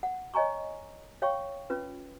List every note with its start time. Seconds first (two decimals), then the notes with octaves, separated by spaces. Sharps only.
0.03 F#5
0.34 C#5 D#5 G#5 A#5 C#6
1.22 C#5 F5 G5 C#6
1.70 C#4 F4 B4